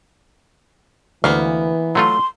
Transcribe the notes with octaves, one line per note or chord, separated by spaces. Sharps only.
D2 E3 A#3 B3 F5
F#3 A3 F4 C6